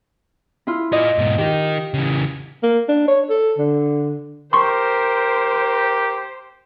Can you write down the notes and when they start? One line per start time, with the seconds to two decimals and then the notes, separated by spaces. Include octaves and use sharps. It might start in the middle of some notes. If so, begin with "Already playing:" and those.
0.67 E4 F4
0.92 F4 D5 D#5
1.18 G#2 B2
1.38 D#3 D#4 G4
1.94 C#3 E3
2.63 A#3
2.88 D4
3.08 C#5
3.30 A4
3.58 D3
4.53 G4 A#4 C5 C6 C#6